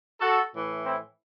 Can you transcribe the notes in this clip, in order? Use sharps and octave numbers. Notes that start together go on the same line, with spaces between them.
F#4 A4
A2 E3
C4 E4